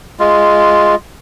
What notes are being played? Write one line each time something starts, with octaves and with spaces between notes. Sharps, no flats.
G#3 F4